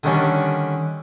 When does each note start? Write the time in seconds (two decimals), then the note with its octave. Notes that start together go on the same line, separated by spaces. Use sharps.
0.04 D3 D#3 G3 C#4 D4 A4